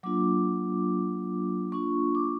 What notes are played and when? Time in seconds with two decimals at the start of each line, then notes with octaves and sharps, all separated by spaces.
0.03 F#3 A#3 D4 F4 D6
1.72 A#3 D4 F4 C#6
2.15 D6